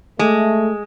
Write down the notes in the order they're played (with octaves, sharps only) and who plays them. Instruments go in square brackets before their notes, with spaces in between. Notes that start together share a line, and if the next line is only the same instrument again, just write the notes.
[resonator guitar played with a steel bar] G#3 [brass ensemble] A3